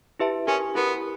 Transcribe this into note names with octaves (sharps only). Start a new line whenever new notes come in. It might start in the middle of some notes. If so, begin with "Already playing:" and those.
E4 G4 B4 E5 A5
C#4 E4 G4 A#4
B3 E4 G4 A#4